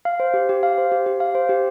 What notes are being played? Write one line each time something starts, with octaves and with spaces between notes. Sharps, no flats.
F5
C5
G4
G4
F5
C5
G4
G4
F5
C5
G4